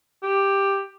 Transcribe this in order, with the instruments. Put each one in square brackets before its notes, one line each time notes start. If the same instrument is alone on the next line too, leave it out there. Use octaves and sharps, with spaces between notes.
[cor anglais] G4